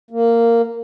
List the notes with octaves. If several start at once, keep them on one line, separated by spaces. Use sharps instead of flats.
A#3